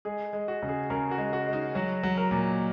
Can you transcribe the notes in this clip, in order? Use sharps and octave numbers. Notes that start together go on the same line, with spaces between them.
G#3 G#4
G#3
F#4
C#3
G#4
C#3 A#4
F#4
G#3
F#4
G#3
D#4
F#3 F#4
F#3
A#4
A#2